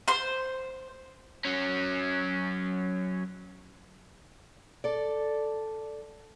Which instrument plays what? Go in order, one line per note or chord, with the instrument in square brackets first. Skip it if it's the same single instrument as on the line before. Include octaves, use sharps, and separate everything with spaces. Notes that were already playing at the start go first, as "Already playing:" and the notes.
[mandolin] C5 C6
[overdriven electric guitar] F#3 C#4
[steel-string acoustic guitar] A4 D5